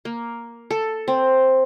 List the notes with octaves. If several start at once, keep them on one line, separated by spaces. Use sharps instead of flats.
A#3
A4
C4